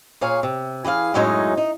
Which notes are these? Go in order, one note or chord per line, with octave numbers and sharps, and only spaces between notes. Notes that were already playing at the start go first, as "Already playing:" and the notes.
A#2 G#4 C#5 F5
C3
E3 G#4 D#5 F5
F#2 A2 F#3 G#3 C#4 D#4
D#4